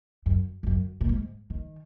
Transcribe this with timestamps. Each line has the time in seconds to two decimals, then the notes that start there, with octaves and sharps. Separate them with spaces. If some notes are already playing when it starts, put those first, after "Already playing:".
0.26 F#2
0.63 F2
0.67 F#2
1.01 A#2
1.09 G#2
1.50 D#3